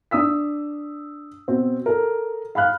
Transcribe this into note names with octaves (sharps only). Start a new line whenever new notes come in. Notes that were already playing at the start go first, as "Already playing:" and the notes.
D4 D#6 E6 B6
B2 C4
A4 A#4
F5 B5 F6 F#6